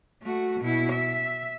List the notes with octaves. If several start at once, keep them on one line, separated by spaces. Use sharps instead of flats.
A3 F#4
B2 E4
E5